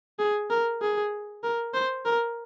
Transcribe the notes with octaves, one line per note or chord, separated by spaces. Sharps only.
G#4
A#4
G#4
A#4
C5
A#4